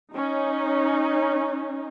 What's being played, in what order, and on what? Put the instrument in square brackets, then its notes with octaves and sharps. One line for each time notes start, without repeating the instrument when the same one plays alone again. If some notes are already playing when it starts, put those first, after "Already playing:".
[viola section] C#4 D#4